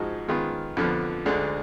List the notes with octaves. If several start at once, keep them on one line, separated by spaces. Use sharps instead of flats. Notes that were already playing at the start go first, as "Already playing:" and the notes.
Already playing: G#2 F3 G#3 D#4 F#4
D#3 G#3 B3 F4
F2 D3 F3 B3
D2 D3 G#3 D4